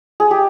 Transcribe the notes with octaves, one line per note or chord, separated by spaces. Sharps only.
G#4
G4